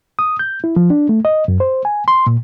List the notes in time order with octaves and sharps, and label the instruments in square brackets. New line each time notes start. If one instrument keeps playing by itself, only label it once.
[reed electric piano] D#6
G6
E4
F3
D4
A3
D#5
F#2
C5
G#5
C6
A#2